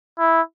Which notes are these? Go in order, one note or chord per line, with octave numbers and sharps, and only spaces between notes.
E4